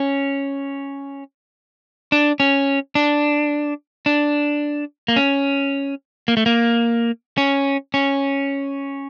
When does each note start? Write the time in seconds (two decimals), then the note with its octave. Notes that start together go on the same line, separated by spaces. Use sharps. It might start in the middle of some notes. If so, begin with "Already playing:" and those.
Already playing: C#4
2.12 D4
2.40 C#4
2.95 D4
4.06 D4
5.08 A#3
5.16 C#4
6.28 A#3
6.37 A3
6.46 A#3
7.38 C#4
7.94 C#4